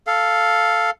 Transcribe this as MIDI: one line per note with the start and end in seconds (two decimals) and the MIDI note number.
0.07 0.90 69
0.07 0.90 77